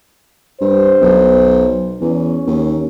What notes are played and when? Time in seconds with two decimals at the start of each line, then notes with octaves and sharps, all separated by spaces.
0.61 G2 C5
1.01 B1
2.01 E2 C#4
2.47 D#2